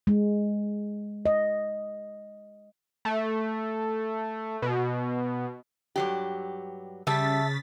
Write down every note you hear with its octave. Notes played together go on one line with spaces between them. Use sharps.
G#3
D#5
A3
B2
G2 F#3 G4
C#3 G3 E5 A5 A6 B6